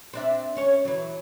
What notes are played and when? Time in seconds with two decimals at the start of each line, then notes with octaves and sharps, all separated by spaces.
0.13 C4 D4 E5
0.56 C#4 C#5
0.85 E3 F#3